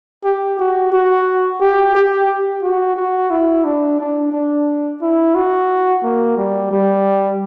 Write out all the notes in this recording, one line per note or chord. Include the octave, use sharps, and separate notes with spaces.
G4
F#4
F#4
G4
G4
F#4
F#4
E4
D4
D4
D4
E4
F#4
A#3
G3
G3